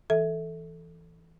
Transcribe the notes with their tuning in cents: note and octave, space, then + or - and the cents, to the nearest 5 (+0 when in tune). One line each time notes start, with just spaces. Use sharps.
E3 +0 A4 +0 E5 -15